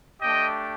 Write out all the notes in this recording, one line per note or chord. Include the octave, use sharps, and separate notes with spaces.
A3 D4 G4 D#5 G5